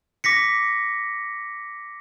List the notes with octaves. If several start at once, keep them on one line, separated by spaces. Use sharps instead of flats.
D6 A#6 B6 C#7